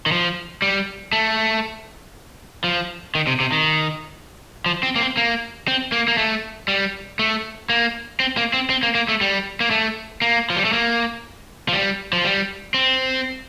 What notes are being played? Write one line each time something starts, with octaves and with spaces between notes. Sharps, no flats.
D#3
F3
G3
A3
F3
D#3
C3
C3
D#3
F3
C4
A#3
C4
A#3
C4
A#3
A#3
A3
G3
A3
A#3
C4
A#3
C4
C4
A#3
A#3
A3
G3
A#3
A3
A#3
F3
G3
A3
A#3
F3
G3
F3
G3
C4